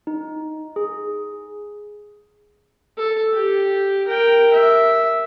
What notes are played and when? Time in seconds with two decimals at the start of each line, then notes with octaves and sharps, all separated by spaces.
0.07 D#4
0.76 G#4
2.98 A4
3.34 G4
4.07 A#4 G5
4.53 E5